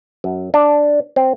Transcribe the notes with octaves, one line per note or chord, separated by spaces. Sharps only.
F#2
D4
C4